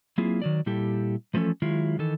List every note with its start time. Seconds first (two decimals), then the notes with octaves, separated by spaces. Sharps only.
0.18 F#3 A#3 C4 E4 F4 G#4
0.42 D#3 F#3 D5
0.66 A#2 G3 E4 G4 A4
1.34 E3 F3 A3 C#4 A4
1.62 D#3 F#3 G#3 E4 F4
1.99 D#3 E3 D#4 A4